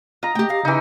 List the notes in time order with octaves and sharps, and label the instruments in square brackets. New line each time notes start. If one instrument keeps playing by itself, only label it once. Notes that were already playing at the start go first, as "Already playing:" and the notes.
[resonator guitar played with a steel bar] F4 [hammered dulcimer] D#5 A#5
[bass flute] A3 [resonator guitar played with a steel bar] G4 G5
[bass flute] G4 [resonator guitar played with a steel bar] F5
[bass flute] C#3 [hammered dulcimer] E3 D#4